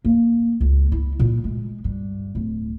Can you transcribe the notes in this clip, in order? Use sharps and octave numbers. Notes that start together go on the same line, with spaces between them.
A#3
C#2
E4
A#2
G#3
G2
D1